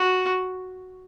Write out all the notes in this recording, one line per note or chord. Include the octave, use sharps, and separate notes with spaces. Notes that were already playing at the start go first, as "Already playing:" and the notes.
Already playing: F#4